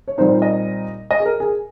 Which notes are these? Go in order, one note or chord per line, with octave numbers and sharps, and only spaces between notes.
C#5
A#2 G3 C4 D#4 C5
D#5
D#5
G#4
A#4
G#4